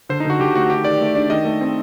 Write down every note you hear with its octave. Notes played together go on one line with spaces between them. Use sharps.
D3 C5
D#4
D3 F#4
D3 G4
A3 F#4
D#3 G4
D#3 D5
A3
D4
D#3 D#5
A3
C4